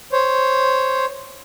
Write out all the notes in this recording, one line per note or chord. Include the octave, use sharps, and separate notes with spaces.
C5 C#5